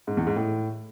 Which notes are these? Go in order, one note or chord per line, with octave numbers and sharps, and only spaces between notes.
G#2
E2
G#2
A2